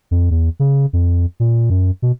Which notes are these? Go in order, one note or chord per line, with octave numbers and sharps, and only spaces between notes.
F2
E2
C#3
F2
A#2
F#2
B2